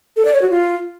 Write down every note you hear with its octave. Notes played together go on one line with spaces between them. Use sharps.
A4
D5
C#5
F#4
F4